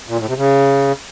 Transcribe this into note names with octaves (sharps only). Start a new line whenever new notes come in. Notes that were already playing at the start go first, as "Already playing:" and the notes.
A#2
A2
C3
C#3